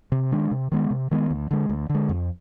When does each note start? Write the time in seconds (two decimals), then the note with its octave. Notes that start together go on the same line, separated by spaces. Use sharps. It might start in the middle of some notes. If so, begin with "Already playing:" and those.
0.12 C3
0.32 D#3 G#3 D4
0.51 C3
0.72 D#3 G#3 B3
0.91 C3
1.11 D#3 G#3 B3
1.30 D2
1.51 D3 G#3
1.69 D2
1.90 D3
1.95 G#3
2.09 F2